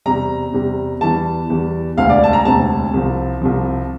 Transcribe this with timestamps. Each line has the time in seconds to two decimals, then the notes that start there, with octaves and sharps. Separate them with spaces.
0.06 E2 C3 G3 A#5
0.54 E2 C3 G3
1.01 E2 E3 G3 A5
1.49 E2 E3 G3
1.97 E1 D2 C3 F5
2.10 D5
2.24 A5
2.33 A#5
2.45 E1 D2 C3 A5
2.94 C2 C3 F3
3.42 C2 C3 F3